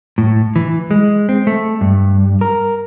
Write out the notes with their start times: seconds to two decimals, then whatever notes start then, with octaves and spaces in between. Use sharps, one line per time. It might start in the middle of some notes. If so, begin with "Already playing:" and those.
0.18 A2
0.56 E3
0.91 G#3
1.29 C4
1.47 A3
1.81 G2
2.41 A#4